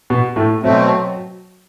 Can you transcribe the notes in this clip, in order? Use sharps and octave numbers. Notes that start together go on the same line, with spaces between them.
B2 B3
A2 A3
B2 F#3 A3 C4